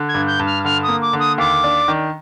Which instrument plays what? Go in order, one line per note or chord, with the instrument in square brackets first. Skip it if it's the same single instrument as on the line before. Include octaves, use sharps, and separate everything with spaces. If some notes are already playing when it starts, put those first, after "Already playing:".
Already playing: [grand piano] D3
[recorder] G#6
[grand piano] G2
[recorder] G6
[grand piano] G2
[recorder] F6
[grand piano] D3 [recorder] F6
[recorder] D#6
[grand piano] A#3
[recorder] D6
[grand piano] D3
[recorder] D#6
[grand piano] D#2 [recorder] D6
[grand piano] D4
D#3